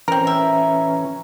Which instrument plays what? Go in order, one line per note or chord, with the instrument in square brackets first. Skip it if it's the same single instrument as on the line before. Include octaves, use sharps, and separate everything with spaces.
[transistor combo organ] E3 C#4 [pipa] C4 A#4 [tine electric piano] A#5
[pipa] E5